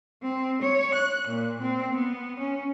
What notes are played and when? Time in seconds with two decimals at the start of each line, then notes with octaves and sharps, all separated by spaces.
0.22 C4
0.62 C#5
0.95 F#6
1.29 A#2
1.61 C4
1.96 B3
2.39 C#4